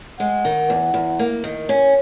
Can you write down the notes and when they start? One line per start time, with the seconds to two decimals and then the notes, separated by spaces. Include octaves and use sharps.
0.19 G#3 F#5
0.45 D#3
0.70 E2
0.94 E2
1.19 A#3
1.44 D#3
1.69 C#4